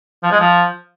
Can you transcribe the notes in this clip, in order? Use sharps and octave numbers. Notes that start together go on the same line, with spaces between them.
F3
G#3
F3